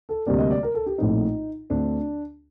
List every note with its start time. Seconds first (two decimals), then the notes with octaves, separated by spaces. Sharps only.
0.09 A4
0.27 D2 C3 G3 A#3 D5
0.38 D#5
0.51 D5
0.63 A#4
0.74 A4
0.86 G4
0.98 A#1 A2 A3 C4 D#4
1.70 D2 D3 A3 C4 D4